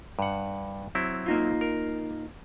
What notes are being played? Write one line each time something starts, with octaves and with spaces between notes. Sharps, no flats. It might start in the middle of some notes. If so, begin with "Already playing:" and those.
G2 F#5
F#3 C4 E4
A#3 D#4 F4
A#4